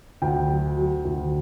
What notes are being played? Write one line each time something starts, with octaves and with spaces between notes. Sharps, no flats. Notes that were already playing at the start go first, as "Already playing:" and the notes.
D2 G5
F#3
F#3
D2